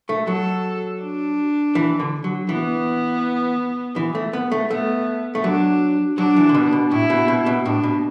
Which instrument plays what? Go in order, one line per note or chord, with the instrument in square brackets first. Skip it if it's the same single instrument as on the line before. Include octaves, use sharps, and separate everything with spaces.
[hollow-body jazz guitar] A3
[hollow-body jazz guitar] F#3 [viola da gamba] A4
[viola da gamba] D4
[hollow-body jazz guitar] E3
D3
F#3
[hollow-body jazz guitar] E3 [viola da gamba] B3
[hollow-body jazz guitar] E3
A3
B3
A3
[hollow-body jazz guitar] A3 [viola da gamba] B3
[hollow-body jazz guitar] A3
[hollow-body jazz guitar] F#3 [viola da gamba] D4
[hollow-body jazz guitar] F#3 [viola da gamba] D4
[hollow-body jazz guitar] E3
D3
B2
B2
[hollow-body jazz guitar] A2 [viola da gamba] E4
[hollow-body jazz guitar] B2
B2
B2
[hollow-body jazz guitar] A2 [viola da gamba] D4
[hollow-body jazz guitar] B2